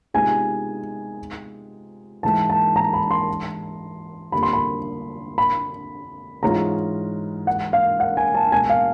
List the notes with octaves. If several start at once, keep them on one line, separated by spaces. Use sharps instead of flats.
C3 F3 G#3 B3 D#4 G#5
G#2 E3 G#3 A5
A5
A#5
B5
C6
F2 D3 G3 A#3 D4 B5
C6
B5
B5
G#2 E3 G#3 C#4 F4 A#5
F#5
F5
F#5
G#5
A5
B2 G#3 B3 G#5
F5